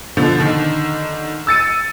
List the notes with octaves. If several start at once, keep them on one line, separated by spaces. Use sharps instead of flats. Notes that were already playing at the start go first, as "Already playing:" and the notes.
B2 D3 F3
D3 D#3
E6 A6 C#7 D#7